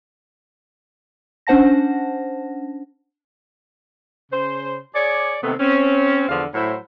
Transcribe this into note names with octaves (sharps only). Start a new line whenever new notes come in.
C#4 D4 C5 F#5 A5 A#6
C#3 C5
G#4 C#5 D5
C3 D#3 A3 B3 C4
C4 C#4
E2 D3 F3 B3 F5
A2 F#3 E4 C5